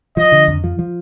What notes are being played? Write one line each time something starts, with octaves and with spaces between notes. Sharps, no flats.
F3 D#5
D3
F2
F3
F3